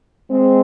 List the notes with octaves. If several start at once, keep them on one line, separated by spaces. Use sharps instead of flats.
G#3 C4